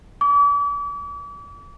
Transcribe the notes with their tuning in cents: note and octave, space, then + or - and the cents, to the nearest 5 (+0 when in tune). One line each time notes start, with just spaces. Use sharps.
D6 -40